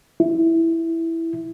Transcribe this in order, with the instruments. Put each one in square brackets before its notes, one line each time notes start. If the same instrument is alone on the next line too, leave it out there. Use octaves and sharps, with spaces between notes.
[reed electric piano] E4